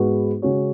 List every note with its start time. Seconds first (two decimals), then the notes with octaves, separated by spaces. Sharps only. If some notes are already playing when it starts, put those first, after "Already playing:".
Already playing: G#2 G#3 B3 F#4 B4
0.42 C#3 G#3 C#4 F#4 C#5